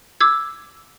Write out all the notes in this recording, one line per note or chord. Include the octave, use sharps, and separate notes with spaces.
D6 E6 G#6